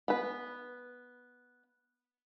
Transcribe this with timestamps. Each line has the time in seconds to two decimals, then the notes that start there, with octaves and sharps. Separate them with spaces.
0.08 B3 B4